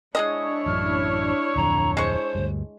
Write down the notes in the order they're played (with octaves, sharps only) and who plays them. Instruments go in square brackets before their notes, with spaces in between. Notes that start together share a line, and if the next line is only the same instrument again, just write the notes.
[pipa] G#3 G#4 D#5 [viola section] D4 E4 C#5
[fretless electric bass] A1 F#2 [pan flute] F6
[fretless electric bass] D1 F2 D3 [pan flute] A#5
[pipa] G#3 C#6 [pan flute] C5
[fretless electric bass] D2 G2